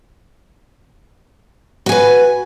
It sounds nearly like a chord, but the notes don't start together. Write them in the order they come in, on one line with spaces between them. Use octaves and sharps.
F#4 G#5 B4